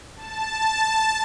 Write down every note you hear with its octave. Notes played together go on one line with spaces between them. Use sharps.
A5